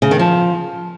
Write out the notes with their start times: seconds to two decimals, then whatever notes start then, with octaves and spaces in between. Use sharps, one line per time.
0.02 C#3
0.11 D#3
0.19 F3